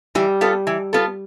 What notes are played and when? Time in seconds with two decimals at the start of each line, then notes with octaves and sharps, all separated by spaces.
0.15 E3 G3
0.41 B3 F4 A4
0.67 E3
0.93 B3 F4 A4